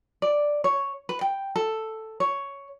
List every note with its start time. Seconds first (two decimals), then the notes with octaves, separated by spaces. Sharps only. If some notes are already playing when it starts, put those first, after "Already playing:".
0.22 D5
0.64 C#5
1.09 B4
1.21 G5
1.56 A4
2.20 C#5